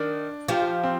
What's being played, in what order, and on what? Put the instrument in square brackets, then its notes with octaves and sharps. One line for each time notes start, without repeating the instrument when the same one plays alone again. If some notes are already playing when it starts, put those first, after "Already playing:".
Already playing: [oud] D#3 [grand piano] D4
[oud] F3 [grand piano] G4
[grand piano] G4
C4